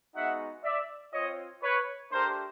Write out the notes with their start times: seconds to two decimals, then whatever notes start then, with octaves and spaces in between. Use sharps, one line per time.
0.15 G#3 B3 D#4 F#4 E5 F#5
0.64 D5 E5
1.13 C4 F4 C#5 D#5
1.63 B4 C#5
2.12 A3 D4 G4 A#4 C5